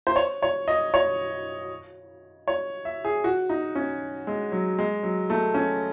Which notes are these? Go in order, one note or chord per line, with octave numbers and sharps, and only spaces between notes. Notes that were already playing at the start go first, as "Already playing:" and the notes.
C5
C#5
C#5
D#5
C#5
C#5
E5
G#4
F#4
D#4
C#4
G#3
F#3
G#3
F#3
A3
C#4